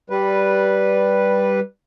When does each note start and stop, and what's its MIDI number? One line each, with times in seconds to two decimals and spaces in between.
0.10 1.60 55
0.10 1.60 71